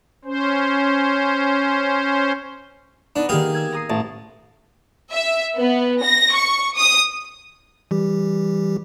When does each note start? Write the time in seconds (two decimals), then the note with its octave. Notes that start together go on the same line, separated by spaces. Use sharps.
0.25 C#4 C5
3.16 B3 D4 D#4
3.29 D#3 A#3 G4 G#4
3.55 E6 G#6
3.72 A#5 D#6 C7
3.90 A1 A5
5.12 E5
5.58 B3
6.03 A#6
6.33 C#6
6.76 D#6
7.91 E3 G3 G4